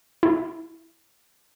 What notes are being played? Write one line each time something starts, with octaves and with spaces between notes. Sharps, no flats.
E4